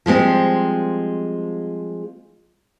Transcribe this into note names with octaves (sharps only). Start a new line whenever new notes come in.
F3 G3 G#3 C4